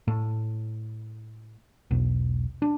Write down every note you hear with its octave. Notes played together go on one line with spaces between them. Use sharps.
A2
E1 B1
D4